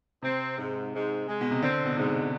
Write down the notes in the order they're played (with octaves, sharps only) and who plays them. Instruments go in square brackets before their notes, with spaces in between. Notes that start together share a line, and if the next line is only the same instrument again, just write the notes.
[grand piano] C3 [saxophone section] C4
[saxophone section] G#2
G#2
G#3
[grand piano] B2
C3
[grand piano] D3 [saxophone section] C4
[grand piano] B2
[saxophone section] G#2 [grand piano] C3